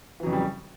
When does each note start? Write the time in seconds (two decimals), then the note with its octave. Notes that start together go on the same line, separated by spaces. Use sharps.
0.20 E3
0.23 F#3
0.26 F2
0.30 C#3
0.33 G3